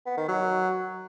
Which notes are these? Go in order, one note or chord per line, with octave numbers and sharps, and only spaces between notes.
B3
D#3
F#3